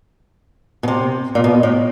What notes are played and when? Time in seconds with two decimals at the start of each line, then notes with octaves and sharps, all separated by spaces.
0.83 B2
0.88 C3
1.35 A#2
1.44 B2
1.63 A2